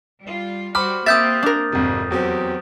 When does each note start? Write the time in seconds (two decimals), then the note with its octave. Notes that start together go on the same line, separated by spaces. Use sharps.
0.23 G3 F4
0.75 G3 F#4 C5 B5 D6 F6
1.06 A#3 C4 G4 E5 D#6 G6 A6
1.43 D4 A#4
1.72 G#1 F2 C3
2.10 E2 F#3 C4 G4